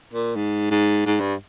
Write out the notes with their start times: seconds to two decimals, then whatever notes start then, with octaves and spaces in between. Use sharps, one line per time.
0.13 A#2
0.36 G#2
0.71 G#2
1.06 G#2
1.20 G2